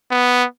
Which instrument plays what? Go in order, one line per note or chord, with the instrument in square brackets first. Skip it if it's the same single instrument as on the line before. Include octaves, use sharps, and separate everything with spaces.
[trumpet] B3